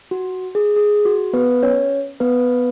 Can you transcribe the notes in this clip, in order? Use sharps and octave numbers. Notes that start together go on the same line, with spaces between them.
F#4
G#4
G#4
F#4
B3 B4
C#4 C#5
B3 B4